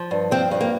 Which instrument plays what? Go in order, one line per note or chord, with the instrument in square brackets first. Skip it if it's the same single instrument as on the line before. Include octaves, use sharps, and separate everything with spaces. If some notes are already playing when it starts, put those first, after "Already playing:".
Already playing: [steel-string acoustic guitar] F3
G2
F3 C4
G2
A#3